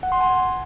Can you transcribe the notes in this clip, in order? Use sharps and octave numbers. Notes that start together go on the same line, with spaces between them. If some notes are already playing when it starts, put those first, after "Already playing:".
F#5
C6
G#5